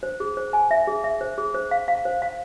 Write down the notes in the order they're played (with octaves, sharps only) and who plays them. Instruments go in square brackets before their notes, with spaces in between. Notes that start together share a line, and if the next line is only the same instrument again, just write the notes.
[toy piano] C5
G#4
C5
G#5
E5
G#4
E5
C5
G#4
C5
F5
F5
C5
F5